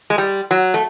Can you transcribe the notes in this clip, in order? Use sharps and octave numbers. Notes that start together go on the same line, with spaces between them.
G#3
G3
F#3
A3